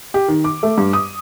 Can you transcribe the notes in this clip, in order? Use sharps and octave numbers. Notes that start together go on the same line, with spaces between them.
G4
D#3
D6
A3
G2
D#6